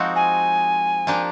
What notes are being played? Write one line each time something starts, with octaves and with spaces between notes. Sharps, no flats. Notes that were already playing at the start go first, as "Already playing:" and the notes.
Already playing: F3 G#3 C4 D#4 F#4
G#5
F3 A#3 D4 G4